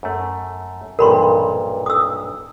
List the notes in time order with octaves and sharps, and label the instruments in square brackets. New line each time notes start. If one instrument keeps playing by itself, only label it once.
[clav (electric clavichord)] F#2 A3
[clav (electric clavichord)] B1 G2 A#2 [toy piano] A#4 B5 C6
[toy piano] D#6 E6